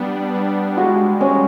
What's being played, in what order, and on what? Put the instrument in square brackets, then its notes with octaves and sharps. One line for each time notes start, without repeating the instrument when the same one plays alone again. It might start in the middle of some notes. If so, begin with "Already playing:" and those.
Already playing: [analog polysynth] G3 B3 D4
G3
[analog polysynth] G#3 [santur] F#4
[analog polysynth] G#3 [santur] C#4